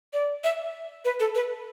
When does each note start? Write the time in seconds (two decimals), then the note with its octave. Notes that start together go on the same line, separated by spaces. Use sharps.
0.13 D5
0.44 E5
1.05 B4
1.20 A4
1.35 B4